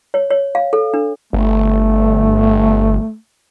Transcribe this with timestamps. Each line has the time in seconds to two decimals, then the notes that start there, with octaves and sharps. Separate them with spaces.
0.14 C#5
0.30 C#5
0.55 F5
0.73 A4
0.94 D4
1.33 G1 A3